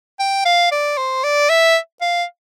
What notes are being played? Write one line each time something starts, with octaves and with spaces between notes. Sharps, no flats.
G5
F5
D5
C5
D5
E5
F5